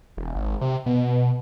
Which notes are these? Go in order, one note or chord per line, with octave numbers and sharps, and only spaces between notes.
E1
G#1
C3
B2